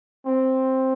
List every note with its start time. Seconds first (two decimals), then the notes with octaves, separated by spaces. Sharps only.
0.26 C4